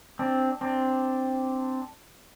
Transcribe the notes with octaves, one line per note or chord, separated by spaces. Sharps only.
C4 D4
C4 D4